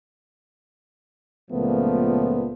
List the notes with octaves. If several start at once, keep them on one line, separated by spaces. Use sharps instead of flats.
C#2 A#2 F3 A3 B3